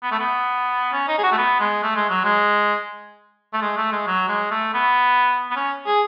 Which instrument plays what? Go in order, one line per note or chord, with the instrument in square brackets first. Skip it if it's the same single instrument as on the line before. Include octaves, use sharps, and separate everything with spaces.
[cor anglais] B3
A3
B3
C#4
D#4
G#4
F#4
A3
B3
G#3
A3
G#3
F#3
G#3
A3
G#3
A3
G#3
F#3
G#3
A3
B3
B3
C#4
G#4